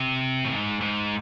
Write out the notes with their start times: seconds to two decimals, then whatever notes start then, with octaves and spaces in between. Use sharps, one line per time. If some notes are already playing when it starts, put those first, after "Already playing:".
Already playing: C3
0.45 A2
0.50 G#2
0.81 G#2